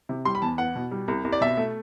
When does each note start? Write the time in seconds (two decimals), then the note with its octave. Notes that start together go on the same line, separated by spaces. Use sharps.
0.09 C3
0.25 G3 C6
0.35 B5
0.42 E2 A5
0.58 B3 F#5
0.75 B2
0.91 G3
1.08 C2
1.24 C2
1.32 D5
1.41 B2 E5
1.57 A3